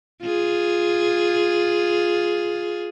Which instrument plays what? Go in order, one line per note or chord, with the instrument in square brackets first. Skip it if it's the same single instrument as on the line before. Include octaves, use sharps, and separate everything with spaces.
[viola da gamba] F4 G#4